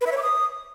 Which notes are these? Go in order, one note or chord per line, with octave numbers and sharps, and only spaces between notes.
B4
E5
C#5
D6
D#6